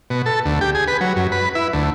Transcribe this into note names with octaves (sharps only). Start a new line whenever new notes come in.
B2
A4
D2
G4
G#4
B4
F#3
F#2
B4
E4
D2